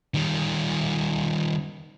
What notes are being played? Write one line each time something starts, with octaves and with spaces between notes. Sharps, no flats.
D#3 G3